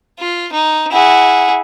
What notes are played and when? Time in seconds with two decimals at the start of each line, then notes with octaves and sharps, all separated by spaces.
0.20 F4
0.52 D#4
0.92 E4 G#4 F#5